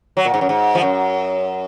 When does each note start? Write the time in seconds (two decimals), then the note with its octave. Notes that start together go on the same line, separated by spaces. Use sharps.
0.17 F#3
0.25 A#2
0.34 G#2
0.41 F#2
0.49 G#2
0.75 F3
0.82 F#2